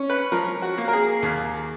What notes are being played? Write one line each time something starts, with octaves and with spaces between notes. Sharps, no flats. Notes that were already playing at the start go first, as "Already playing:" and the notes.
Already playing: C#4
B4
F3 A#4
F#4
A#3
A#4
G#4
D#2